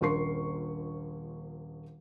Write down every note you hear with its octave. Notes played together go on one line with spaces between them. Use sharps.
D#1 A#1 A#4 C6 C#6 C7